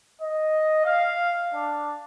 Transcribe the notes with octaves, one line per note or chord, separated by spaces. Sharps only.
D#5
F5
D4